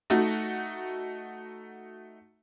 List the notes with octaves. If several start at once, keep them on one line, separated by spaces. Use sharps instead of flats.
A3 D#4 F#4